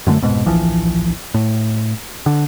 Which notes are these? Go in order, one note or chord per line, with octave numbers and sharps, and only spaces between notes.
F#2 D3 G#3 A3
F1 G#2 B2
D1 A#1 E3 F3
A2
D3